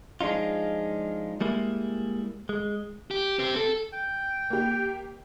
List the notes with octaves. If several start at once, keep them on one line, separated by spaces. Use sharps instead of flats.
F3 G#3 D4 D#4 F4
G3 G#3 A#3 E4
G#3
G4
C4 G4
A4
G5
A#3 G4